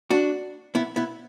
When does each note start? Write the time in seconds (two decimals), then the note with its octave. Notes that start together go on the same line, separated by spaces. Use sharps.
0.10 D4 F#4
0.75 B3 E4
0.96 B3 E4